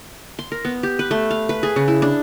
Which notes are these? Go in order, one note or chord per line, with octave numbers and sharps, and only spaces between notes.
C6
A#4
B3
G4
B4
A3
F5
B4
G#4
C#3
E4
D4